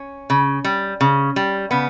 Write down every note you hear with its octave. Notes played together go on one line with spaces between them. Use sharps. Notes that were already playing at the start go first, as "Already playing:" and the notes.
Already playing: C#4
C#3
G3
C#3
G3
C#3 B3